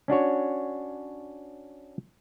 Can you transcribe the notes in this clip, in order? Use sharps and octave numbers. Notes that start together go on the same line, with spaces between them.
C#4 D4 F#4 C#5